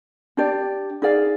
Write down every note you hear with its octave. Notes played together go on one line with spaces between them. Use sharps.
D4 G4 D5
D#4 G#4 D5 F5